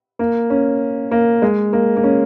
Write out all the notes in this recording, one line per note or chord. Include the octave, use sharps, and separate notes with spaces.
A#3
C#4
A#3
G#3
A#3
A#3
C#4